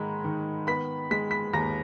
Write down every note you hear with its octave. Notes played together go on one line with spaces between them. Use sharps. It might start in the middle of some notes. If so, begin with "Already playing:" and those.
Already playing: G#2 D#3 G#3 A#5 B5
D#3
B3 B5 B6
G#3 B6
B5 B6
D#2 A#5 A#6